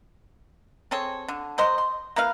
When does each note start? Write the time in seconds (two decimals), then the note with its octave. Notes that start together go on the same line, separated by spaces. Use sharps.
0.91 C4 G#4 A4 C#5
1.28 D3
1.58 F#3 C5 D#5 C6
1.78 C6
2.16 A#3 E4 B4 F5